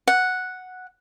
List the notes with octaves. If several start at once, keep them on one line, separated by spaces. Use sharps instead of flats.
F#5